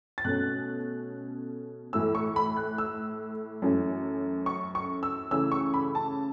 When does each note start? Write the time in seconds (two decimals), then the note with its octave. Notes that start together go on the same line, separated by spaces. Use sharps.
0.18 A6
0.24 B2 A3 C#4 F#6
1.93 A2 E3 A3 E6
2.15 C#6
2.36 B5
2.57 F#6
2.78 E6
3.62 F#2 E3 A3 C#4
4.46 C#6
4.75 C#6
5.03 E6
5.31 C#3 E3 A3 C#4 E6
5.52 C#6
5.74 B5
5.95 A5